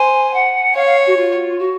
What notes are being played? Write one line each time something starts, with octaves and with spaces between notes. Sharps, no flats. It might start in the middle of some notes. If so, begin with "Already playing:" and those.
Already playing: C5 G#5
F#5
C#5 F5
F5
F#4
F4
F#4